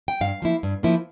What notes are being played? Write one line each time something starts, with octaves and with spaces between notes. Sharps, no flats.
G5
G2 F5
F3 A#3 E4
G2
F3 A#3 E4